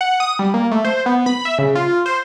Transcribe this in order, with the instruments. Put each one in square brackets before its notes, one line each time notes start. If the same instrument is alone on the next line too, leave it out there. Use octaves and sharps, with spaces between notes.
[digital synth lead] F#5
D#6
G3
A#3
A3
C5
B3
B5
E5
C#3
F4
C5